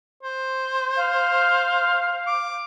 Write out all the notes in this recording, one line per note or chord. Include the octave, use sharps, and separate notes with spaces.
C5
F5
D6